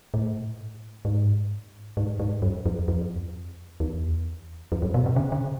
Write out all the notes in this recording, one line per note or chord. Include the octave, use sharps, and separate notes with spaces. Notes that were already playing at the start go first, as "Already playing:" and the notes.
A2
G#2
G#2
G#2
F#2
F2
F2
E2
F2
F#2
B2
C3
C#3
C#3